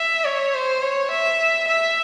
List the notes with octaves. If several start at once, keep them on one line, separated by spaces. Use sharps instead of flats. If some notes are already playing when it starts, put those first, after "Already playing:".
Already playing: E5
C#5
C5
C#5
E5
E5